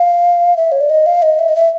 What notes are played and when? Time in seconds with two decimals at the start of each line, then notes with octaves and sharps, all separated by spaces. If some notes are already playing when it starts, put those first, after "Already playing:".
Already playing: F5
0.57 E5
0.72 C#5
0.81 D5
0.89 D#5
1.06 F5
1.22 D#5
1.39 E5
1.48 D#5
1.55 E5